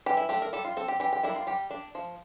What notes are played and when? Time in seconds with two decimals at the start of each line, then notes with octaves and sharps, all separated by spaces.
0.06 E3 G4
0.17 E4
0.29 A3 D4 G4
0.42 A#4
0.53 G3 A4
0.65 F4
0.77 C4 A4
0.88 G4
1.00 E3 G4
1.13 G4
1.23 G3 A#3 D4 E4
1.36 F4
1.47 G3 G4
1.71 D4
1.95 F3